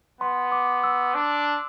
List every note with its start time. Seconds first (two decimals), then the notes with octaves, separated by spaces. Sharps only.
0.21 B3 C6
0.52 D6
0.84 E6
1.14 D4